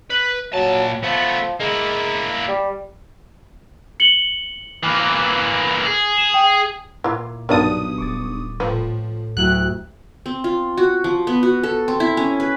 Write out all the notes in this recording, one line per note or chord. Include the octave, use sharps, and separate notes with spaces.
B4
A#2 F#3 A5
F3 A3 B3
G#3 A#3 E4
G3
C#7 F#7 G7
E3 A#3
G#4
E7
G5
A#2 E4 F4
B1 G2 A#4 D5 A5 D#6
D#1 C#6 D6 A6
A2 F3 B4
D2 F#3 E4 G4 F#6
C4
F4
F#4
F3
B3
F#4
A4
C4
E4
C#4
B4